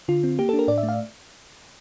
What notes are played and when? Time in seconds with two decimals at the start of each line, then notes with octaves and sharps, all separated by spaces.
0.08 D3 F4
0.24 C4
0.39 A#3 G4
0.49 D4 A4
0.59 A#4
0.68 A2 D5
0.78 E5
0.83 A3
0.89 F5